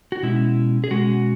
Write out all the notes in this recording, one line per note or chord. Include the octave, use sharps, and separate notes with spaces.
F#4
B2 G#3 C#4 E4
G#4
B2 G#3 C#4 F#4